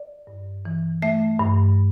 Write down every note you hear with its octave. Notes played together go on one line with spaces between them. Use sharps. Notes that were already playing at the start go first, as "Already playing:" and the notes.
Already playing: D5
G2
E3
A3 E5
G2